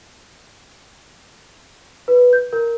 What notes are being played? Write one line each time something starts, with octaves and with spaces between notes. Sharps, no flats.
B4
G6
A#4